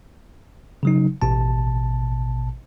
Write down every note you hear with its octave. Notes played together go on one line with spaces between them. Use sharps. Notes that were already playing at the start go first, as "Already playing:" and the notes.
C#3 F#3 D#4
A1 B2 A5